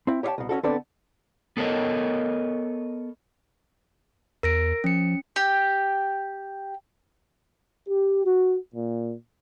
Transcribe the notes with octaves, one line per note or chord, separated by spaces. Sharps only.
C4 E4
G4 C#5 D#5 F5 G5 A5
C2 B2
C#4 E4 F#4 A4
D3 B3 C4 D4 A4 D5
B3 A4 A#4 C#5 D#5
E2 A#4 A#6 D7
F3 C#4 C#7
G4
G4
F#4
A#2